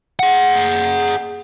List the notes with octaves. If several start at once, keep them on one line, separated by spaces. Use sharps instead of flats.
G#4 F#5